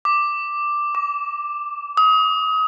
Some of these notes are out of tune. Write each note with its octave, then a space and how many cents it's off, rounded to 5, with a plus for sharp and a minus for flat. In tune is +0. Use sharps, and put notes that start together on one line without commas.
D6 +5
D6 -20
D#6 +30